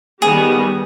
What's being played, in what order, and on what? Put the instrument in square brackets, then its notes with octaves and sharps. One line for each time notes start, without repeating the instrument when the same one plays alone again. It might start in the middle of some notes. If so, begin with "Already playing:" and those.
[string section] D#3 G3 B3 [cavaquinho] G#4